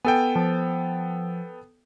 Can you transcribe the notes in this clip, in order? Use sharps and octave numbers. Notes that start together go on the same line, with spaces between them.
B3 A4 G5 G#5
F3